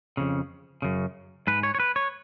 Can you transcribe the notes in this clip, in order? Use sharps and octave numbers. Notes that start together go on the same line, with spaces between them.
F2 C#3
F#2 C#3
G#2 B4
C#5
C#5
B4
C#5